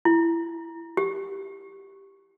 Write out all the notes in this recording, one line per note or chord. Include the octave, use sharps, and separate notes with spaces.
E4
G4